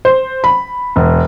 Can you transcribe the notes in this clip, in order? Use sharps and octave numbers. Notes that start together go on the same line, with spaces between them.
C5
B5
E1